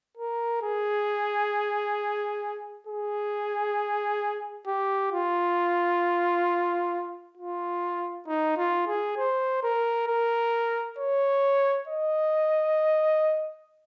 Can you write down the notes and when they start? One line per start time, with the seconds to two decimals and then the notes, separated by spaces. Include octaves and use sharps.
0.17 A#4
0.63 G#4
2.87 G#4
4.67 G4
5.12 F4
7.38 F4
8.27 D#4
8.57 F4
8.88 G#4
9.18 C5
9.63 A#4
10.07 A#4
10.98 C#5
11.88 D#5